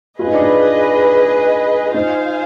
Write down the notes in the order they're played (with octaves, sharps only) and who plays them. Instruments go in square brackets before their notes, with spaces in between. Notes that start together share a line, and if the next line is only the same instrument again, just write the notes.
[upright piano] F4 [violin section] G#4 B4 D#5
[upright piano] D#4
D4
D#4
[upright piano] D#4 [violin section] F4 C5 F5 G#5